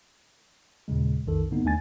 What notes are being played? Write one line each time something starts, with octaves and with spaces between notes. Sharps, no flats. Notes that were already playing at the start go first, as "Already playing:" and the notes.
D#2 A#2 C#3 G#3
B1 F2 D#3 A4
G2 D3 A#3 B3 D#4
D#2 A3 D4 G#5 A6